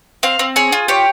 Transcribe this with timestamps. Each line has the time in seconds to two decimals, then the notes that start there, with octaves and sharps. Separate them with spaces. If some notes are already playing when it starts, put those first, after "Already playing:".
0.23 C4 F5
0.39 C4
0.56 G#4 C#5
0.72 F4
0.88 G4 C#5